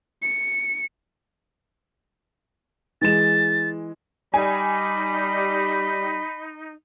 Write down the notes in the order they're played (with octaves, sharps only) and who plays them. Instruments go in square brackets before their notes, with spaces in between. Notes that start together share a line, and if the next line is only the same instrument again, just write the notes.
[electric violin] C#7
[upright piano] E3 G#3 E7 [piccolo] A6
[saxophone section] G3 [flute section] D#4 [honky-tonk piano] G#5 [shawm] B5